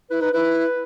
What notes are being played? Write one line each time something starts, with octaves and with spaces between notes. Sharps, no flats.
E4 B4
D#4 B4
E4 B4